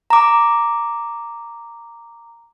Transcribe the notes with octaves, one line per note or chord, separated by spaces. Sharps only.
A#5 D6